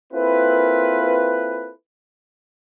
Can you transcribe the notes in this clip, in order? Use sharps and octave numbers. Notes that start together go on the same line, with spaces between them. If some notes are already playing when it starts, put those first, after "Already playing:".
A#3 C4 E4 F4 A4 B4